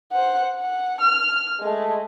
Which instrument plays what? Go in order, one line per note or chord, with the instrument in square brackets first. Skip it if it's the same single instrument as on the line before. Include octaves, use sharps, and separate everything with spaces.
[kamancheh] C5 F#5
F#5
F6
G#3 A3